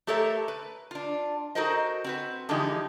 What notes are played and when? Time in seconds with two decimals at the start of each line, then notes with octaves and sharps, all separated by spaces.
0.07 A3 G4 A4 A#4 C#5 E5
0.48 B4
0.91 D4 F4
1.55 D#4 F#4 A4 A#4 C5 D#5
2.04 C4 F#4 B4
2.49 D3 E3 F3 G#3 D#4 G4